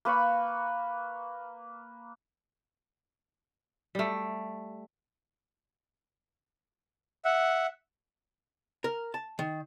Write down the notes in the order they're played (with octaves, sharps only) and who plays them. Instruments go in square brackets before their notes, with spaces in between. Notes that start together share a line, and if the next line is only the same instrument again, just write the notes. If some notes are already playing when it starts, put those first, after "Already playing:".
[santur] A#3 B4 B5 C#6
[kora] G3 A3
[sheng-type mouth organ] E5 F#5
[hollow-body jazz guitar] A#4
A5
D#3